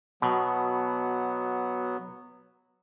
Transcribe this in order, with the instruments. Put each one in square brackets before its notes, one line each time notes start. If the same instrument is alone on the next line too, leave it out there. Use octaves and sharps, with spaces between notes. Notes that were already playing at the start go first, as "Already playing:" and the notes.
[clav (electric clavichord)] B2 [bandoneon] F#3 B3